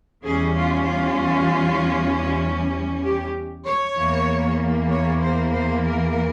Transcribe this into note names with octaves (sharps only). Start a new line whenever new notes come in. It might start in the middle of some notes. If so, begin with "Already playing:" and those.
E2 E3 G3 C#4 G#4
F4
F4
G4
C#5
E2 E3 A#3
C#5
C5
C5
A#4